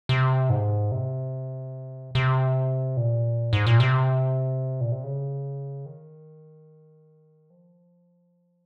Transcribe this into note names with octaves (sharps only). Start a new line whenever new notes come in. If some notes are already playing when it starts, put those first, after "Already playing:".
C3
G#2
C3
C3
A#2
G#2
A#2
C3
A#2
C3
C#3
D#3
F3